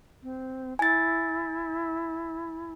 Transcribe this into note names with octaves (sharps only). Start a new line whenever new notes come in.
C4
E4 G#5 A6